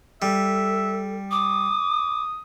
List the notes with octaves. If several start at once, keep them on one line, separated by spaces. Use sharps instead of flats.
G3 A4 E5
D6 D#6